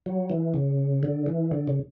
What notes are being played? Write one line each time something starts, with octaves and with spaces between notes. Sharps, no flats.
F#3
E3
C#3
D3
E3
D3
C#3